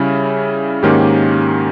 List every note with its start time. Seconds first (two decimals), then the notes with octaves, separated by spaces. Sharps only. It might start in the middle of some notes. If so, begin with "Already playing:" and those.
Already playing: C#3 G3 C#4 E4
0.83 G#2 D#3 A#3 C#4 G4